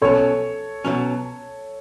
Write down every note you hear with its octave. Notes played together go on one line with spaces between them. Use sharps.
B2 F#3 C#4 A4 C#5
B2 F#3 C#4